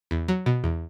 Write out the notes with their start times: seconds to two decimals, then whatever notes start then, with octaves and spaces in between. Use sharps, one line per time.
0.11 E2
0.28 F#3
0.46 B2
0.64 E2